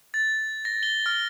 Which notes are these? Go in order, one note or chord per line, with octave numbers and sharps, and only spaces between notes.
A6
A#6
G7
F6